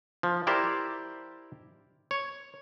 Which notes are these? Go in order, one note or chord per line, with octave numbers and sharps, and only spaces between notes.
F3
E4 G4 A#4 C5 D5
C#5